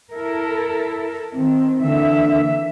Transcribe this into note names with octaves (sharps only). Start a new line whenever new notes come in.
E4 A4 A#4
D#3 C4
D3 E3 A#3 E5